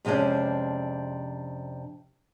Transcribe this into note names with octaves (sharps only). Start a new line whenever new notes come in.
F2 C3 G#3 C#4 D4